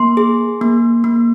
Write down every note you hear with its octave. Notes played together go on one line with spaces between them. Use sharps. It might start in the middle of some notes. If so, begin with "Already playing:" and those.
Already playing: A#3 C6
G#4
A#3
A#3